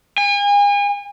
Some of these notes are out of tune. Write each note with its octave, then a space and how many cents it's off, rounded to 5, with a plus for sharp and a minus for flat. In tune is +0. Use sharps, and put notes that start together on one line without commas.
G#5 -40